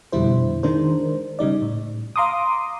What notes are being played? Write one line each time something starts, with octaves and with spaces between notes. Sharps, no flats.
F2 B2 D3 G3 E4 C5
D#3 G#3 D4 A#4 C5
C#3 G3 D#4 D5
A2
F5 A#5 C6 D6 D#6